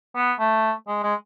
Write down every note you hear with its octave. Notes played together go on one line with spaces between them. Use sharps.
B3
A3
G#3
G#3